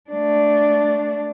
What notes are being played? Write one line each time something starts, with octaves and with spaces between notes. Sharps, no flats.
A3 D4